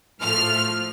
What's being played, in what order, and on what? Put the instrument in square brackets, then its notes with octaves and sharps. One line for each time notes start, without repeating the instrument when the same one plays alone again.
[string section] A2 F3 A3 F6